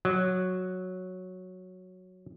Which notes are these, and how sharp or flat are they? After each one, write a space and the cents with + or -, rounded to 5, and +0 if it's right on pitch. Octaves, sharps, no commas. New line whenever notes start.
F#3 -5 D5 +45